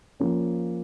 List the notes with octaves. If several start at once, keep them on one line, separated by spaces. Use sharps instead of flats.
F3 A#3 C#4